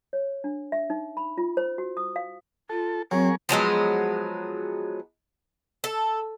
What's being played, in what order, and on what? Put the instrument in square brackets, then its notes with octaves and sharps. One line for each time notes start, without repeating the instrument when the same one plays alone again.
[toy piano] C#5
D4
E5
D#4
B5
F4
C5
F#4
D#6
F5
[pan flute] F4 [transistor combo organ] A4
[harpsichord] F#3 [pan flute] C4 [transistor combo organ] G#4 A#4 C#6
[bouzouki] F3 F#3 G#3 B3
A4